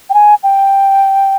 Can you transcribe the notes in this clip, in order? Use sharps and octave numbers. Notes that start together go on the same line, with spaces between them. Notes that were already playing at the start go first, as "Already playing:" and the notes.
G5
G#5
G5